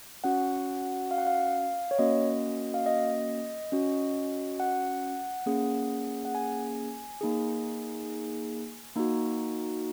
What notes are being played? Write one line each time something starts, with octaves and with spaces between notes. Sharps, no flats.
C#4 F#4 F#5
F5
F#5
F5
C#5
A#3 C#4 F#4 D#5
F5
D#5
C#4 F#4
F#5
A#3 C#4 G#4
F#5
G#5
A#3 D#4 G#4
A#3 D#4 F#4